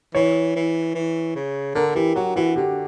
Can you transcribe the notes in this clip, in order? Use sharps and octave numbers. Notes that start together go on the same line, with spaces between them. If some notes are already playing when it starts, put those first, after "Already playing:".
E3 C#5
E3
E3
C#3
D3 A#4
E3 G4
F#3 F#4
E3 F#4
D3 G4